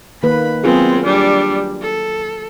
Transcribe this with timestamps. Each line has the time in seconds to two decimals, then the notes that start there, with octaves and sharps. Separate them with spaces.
0.23 D#3 A#3 B4 B5
0.64 F#3 B3 C4 F4 G#4
1.05 G3 D4
1.82 A4